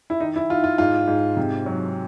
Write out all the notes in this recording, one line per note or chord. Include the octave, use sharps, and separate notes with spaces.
E4
D#3 D#4
E4
D#3 F4
F4
G#2 F4
G#2
C3
F#3